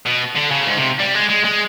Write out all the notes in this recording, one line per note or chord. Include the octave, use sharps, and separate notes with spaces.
B2
D3
C#3
G#2
C3
G3
G#3
G#3
G#3